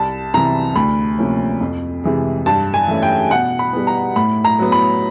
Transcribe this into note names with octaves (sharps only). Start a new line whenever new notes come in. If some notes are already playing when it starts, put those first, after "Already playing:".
Already playing: C2 A5
C3 E3 A#5
D2 B5
C3 F3 A#3 C#4
F2
C3 E3 G#3
G2 A5
G#5
E3 A3 C#4
G5
B2 F#5
B5
G3 B3
A#5
A2 B5
A#5
F#3 B3
B5